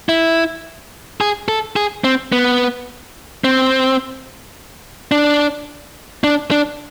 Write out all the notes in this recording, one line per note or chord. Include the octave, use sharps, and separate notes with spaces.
E4
G#4
A4
G#4
C4
B3
C4
D4
D4
D4